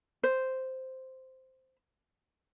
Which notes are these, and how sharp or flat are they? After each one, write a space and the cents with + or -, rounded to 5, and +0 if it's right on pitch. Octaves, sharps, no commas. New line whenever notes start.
C5 -5